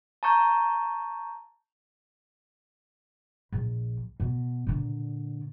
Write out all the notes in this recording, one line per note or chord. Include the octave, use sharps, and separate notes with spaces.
A5 A#5 C#6 G6
A#1
B2
A#2 D3